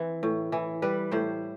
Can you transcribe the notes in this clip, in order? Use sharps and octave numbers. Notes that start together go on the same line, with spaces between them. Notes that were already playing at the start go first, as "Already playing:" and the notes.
Already playing: E3 C4
A2
E3
G3 B4
A2 C5